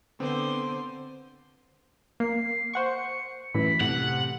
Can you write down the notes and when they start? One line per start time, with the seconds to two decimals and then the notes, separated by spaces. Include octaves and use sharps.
0.20 D3 B3 C4 C5
2.20 A#3 C7
2.74 C5 F#5 C#6 C#7
3.54 F#2 A2 E3 B5
3.81 A2 C3 F#5